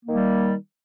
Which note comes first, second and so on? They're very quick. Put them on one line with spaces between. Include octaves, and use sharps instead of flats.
A#3 D#3 G3